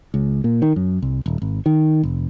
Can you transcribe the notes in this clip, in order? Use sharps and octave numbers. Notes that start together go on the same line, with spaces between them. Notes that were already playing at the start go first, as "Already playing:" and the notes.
C#2
A#2
D#3
F#2
C2
D#1
G#1
D#3
F1